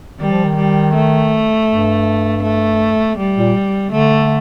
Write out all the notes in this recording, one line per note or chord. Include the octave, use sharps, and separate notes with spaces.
D#3 G3
F3
D#3
G3
A3
G2
A3
G3
A#2
D3 A3